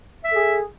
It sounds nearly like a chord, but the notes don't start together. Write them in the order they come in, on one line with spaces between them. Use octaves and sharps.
E5 A4 G#4